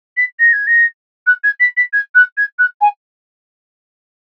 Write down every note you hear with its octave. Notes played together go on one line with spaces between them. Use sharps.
B6
A#6
G#6
A#6
F#6
G#6
B6
B6
G#6
F#6
G#6
F#6
G#5